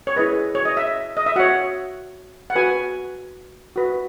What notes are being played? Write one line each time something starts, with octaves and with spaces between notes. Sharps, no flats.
C#5
E4 G#4 B4 D#5
C#5
D#5
E5
D#5
E5
F#4 C#5 F#5
F#5
F#4 B4 G#5
F#4 B4